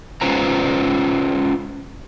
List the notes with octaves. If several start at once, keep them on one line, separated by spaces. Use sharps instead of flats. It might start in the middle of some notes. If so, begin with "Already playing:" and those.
G#3 C#4 F4 B4 C5 A#5